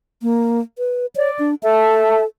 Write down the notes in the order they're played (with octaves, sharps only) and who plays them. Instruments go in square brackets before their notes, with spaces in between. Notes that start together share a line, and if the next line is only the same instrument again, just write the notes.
[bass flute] A#3
B4
[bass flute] C#5 [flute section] D5
[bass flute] D4
[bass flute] A4 [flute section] E5 A5